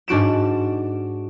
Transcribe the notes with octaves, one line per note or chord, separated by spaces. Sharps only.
G#2 D4 F#4 D7 E7